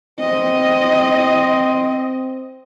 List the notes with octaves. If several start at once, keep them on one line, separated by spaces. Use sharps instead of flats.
C4 D#5